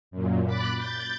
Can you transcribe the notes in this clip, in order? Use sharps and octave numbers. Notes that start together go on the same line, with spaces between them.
F#2 A#2
B5 D6 F#6 A6
G6 A6